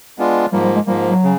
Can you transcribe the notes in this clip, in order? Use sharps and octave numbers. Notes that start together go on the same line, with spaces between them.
G#3 B3 D4 F4
G#2 F3 G3 A#3
G3
G#3
G#2 F3 G3 A#3
F#3
C#3